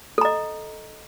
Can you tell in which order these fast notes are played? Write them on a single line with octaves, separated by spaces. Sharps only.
A4 A#5 D#5